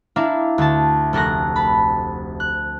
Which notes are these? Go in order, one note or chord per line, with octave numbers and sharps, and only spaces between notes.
D4 E4 E5 F5 A#5
D2 A5
F1 A4 A#4 F#6 A#6
A5 B5
F#6